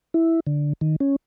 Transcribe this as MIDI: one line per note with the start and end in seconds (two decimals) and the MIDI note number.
0.14 0.40 64
0.47 0.73 50
0.81 0.96 51
1.00 1.16 61